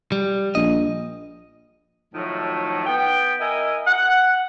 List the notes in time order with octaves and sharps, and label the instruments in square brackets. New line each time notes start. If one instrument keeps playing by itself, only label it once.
[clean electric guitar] G3
[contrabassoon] A#1 [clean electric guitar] D#5
[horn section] A2 D#3 F3 F#3 A3
B3 G5
E4 A#4 D#5 E5 G#5
F#5